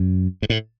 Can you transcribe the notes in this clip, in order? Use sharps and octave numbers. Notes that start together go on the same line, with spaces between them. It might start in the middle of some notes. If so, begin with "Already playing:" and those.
Already playing: F#2
G#2
A2